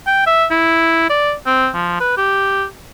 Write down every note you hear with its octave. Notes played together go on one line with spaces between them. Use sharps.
G5
E5
E4
D5
C4
F3
B4
G4